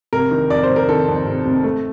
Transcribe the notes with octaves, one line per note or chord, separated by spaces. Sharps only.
F1 A#4
D#3
F2 D5
C5
F1
A#4
D#3 A4
F2
F1
F1
A3